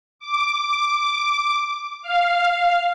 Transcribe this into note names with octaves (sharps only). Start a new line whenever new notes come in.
D6
F5